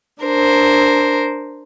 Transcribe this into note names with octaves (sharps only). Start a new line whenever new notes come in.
D4 A#4 C5